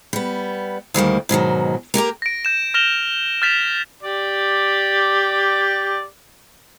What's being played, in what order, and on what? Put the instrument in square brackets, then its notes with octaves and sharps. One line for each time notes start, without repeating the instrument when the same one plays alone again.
[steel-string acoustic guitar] G3 B3
D2 D#3 G3 A#3
G#2 B2 D#3 F#3
A#3 G4 A#4 A#5
[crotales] A#6 D7
G6 E7
F6 A#6 E7 F7 G7
F6 G6 A6 B6 E7 F7
[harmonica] G4 D5